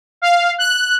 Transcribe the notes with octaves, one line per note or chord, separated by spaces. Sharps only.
F5
F#6